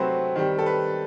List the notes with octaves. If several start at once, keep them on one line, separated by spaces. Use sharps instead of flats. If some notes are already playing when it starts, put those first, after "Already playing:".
Already playing: C3 F#3 A3 C4 B4 C5
D#3 G3
A4
B4